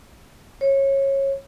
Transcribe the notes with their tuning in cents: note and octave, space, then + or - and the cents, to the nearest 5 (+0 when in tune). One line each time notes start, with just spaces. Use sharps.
C#5 -20